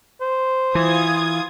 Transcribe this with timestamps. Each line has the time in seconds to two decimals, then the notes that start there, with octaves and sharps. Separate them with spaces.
0.21 C5
0.75 E3 F4 D#6 G#6